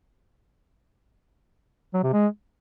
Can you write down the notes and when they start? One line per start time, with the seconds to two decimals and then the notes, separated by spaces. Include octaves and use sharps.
1.94 F#3
2.03 C3
2.13 G#3